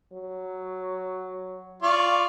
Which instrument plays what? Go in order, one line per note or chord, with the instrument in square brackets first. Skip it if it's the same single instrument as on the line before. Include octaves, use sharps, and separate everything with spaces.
[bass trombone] F#3
[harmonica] F4 D5 C#6